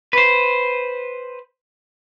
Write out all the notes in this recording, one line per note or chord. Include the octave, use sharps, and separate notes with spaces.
B4 C5